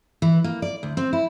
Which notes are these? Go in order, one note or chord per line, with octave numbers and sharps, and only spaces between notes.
E3
A#3
D5
D2
C4
E4